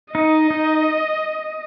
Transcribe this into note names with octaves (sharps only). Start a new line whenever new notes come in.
D#4 D#5
D#4